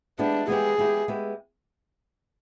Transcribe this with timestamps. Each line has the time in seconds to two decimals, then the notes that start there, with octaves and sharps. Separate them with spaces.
0.19 G#3 B3 D4 E4 G4
0.48 G#3 B3 E4 G4 G#4
0.78 G#3 B3 E4 G4
1.08 G#3 B3 E4 G4